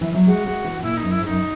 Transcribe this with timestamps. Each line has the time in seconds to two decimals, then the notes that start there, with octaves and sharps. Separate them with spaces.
0.01 E3
0.14 F#3
0.27 G#3 F#4
0.46 G#3
0.64 E3
0.78 B2
0.83 A#2 E4
0.97 D#4
1.02 F#2
1.11 E4
1.21 G#2
1.25 F#2 D#4